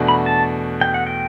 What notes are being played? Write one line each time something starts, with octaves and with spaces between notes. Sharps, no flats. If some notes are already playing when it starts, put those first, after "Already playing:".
Already playing: E2 B2 A3 D4 F#4
B5
A5
G5
F#5
G5